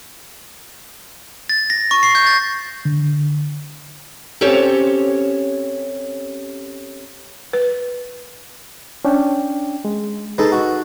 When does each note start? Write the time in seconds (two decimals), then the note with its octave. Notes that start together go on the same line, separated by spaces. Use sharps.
1.50 A6
1.70 A#6
1.91 C#6
2.03 C7
2.15 G6
2.27 A6
2.85 D3
4.41 C4 C#4 G4 A4 C#5
7.53 B4
9.05 C#4 D4 G5
9.85 G#3
10.38 G#3 D#4 A4 B4
10.52 F#4